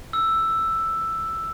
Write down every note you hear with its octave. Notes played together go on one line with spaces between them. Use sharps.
E6